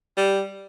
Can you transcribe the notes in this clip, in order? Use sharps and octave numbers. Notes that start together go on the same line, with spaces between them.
G3